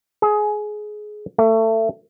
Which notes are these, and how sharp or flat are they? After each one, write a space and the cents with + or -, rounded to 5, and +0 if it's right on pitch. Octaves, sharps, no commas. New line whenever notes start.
G#4 +20
A3 +25